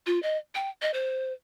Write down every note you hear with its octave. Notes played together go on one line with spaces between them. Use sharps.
F4
D#5
G5
D#5
C5